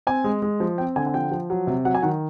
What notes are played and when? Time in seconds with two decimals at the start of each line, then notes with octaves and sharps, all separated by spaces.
0.07 C4 G#5
0.24 G#3
0.42 G#3
0.60 F3
0.78 C4 G5
0.96 D3 G#5
1.07 G#5
1.14 F3 G5
1.31 F3
1.50 F#3
1.67 C3
1.85 F#3 F#5
1.95 G#5
2.02 D#3 F#5